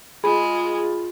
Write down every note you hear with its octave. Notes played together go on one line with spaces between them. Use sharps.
G#3 F4 G#4 B5